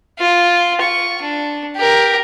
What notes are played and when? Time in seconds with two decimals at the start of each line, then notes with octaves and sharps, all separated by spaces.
0.18 F4
0.81 C#6
1.22 D4
1.76 G4 A#4